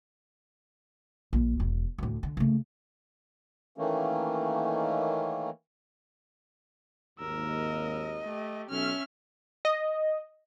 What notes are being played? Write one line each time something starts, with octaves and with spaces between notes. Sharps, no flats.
A#1
E1
D2 A2
D3
C#3 A3
D#3 E3 A3 A#3 C#4
G#1 D#2 A#4 E6
D#5
A3 G4
B1 C#4 E5 F6
D#5